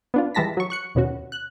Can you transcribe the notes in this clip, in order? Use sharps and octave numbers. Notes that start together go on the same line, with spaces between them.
B3 D4 F4
E3 G3 G#3 A5 A#6 B6
F#3 C#6
C#6 F#6 C#7
D#2 B2 C#4 F#4
F#6